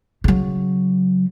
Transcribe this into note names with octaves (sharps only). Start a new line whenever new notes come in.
C#3 F#3